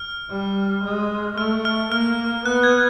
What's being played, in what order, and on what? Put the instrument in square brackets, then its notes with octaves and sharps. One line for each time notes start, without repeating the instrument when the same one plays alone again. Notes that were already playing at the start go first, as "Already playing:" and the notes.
Already playing: [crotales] F6
[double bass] G3
G#3
[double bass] A3 [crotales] F6
[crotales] F6
[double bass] A#3 [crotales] F6
[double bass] B3 [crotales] F#6
[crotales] G#6